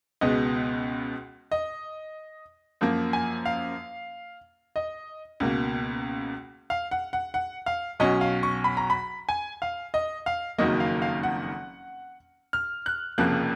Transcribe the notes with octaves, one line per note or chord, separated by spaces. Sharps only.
C#2 B2 G#3 B3 D#5
D#5
F#2 F3 A#3
G#5
F5
D#5
C#2 B2 A#3
F5
F#5
F#5
F#5
F5
B1 B2 F#3 C#4 D#5
F5
C#6
B5
A#5
B5
G#5
F5
D#5
F5
F#1 F2 D#3 F#3 A#3 D#5
F5
F5
F#5
F6
F#6
F1 F2 C#3 F3 A#3 F#6